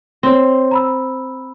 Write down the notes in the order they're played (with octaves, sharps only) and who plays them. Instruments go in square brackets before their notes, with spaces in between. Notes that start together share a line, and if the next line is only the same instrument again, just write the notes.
[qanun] C4 [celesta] C#5 C6
[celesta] A#5 B5 E6